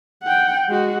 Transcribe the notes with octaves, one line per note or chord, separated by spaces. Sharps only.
F#5 G5
G#3 F#4